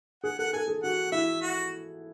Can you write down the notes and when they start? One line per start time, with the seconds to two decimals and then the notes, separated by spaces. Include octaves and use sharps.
0.24 G#4 F#5
0.39 A4 F#5
0.53 A4 G#5
0.68 G#4
0.83 F#4 F#5
1.12 E4 E5
1.42 F#4